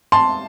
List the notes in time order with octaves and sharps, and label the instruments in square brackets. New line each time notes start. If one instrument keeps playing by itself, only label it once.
[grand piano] A5 C6